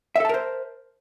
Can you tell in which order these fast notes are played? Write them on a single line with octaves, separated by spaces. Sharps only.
E5 A4 A5 A#4 C5